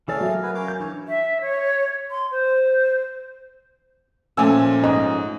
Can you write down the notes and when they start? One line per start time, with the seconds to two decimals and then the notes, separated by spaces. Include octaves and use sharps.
0.08 E3 A3 G#4 A4 C#5 D5 F5
0.20 F#3 A#4 E5
0.43 B3 B4 G#6
0.55 C#4 F5 D6
0.68 G6
0.80 E3 D4 C#5
1.08 E5
1.41 C#5
2.11 C6
2.31 C5
4.37 A#2 F3 A3 C#4 G#5 E6
4.84 G#2 D#5